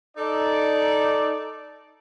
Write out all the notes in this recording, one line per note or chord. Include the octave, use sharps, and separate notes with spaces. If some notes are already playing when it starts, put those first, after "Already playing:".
D#4 A4 D5